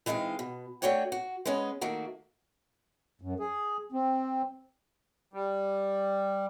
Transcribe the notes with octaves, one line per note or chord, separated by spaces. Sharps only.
E3 G#3 C4 D#4 F5
B2
A3 D4 F#4 C#5 G5 G#5
F#4
G#3 B3 C#4 D#5
D#3 A3 A#3 F#4
F#2
G#4
C4
G3